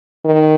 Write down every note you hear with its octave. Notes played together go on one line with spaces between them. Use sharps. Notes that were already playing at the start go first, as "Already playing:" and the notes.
D#3